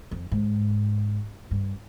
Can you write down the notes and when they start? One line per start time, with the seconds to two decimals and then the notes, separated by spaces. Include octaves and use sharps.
0.11 F2
0.32 G#2
1.51 G2